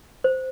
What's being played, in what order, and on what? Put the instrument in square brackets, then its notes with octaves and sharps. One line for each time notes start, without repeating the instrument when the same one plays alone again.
[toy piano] C5